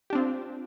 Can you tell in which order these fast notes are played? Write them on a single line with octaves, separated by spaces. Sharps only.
G4 D4 C4 F4